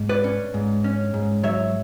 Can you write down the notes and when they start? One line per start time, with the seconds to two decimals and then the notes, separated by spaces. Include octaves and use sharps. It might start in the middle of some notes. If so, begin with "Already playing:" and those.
Already playing: G#2
0.09 B4 D5
0.24 C#4
0.54 G#2
0.84 C#4
1.14 G#2
1.43 F#3 C#5 E5